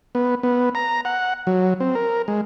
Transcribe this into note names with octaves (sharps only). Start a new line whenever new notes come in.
B3
B3
A#5
F#5
F#3
C4
A#4
G#3